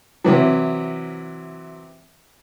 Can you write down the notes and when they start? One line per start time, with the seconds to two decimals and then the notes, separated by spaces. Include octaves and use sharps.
0.24 C3 E3 F#3